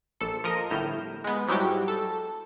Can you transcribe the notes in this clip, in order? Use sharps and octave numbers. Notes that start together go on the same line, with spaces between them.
A#1 A4 C#7
F3 A#4 D#5
G1 A2 F6 G6 E7
G#3 B3
G#2 F#3 G3 E4 F#4 G4
A4